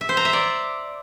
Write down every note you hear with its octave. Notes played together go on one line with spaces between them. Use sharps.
E5
C5
A#5
E5
D5